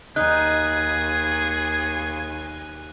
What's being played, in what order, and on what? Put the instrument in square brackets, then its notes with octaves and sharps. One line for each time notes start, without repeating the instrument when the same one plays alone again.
[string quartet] D#2 G#5 [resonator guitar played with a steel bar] D#4 [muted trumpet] G#4 [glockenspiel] F#6